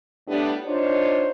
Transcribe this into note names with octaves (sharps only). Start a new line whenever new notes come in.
A2 G3 B3 D4
D4 D#4 F4 C5 C#5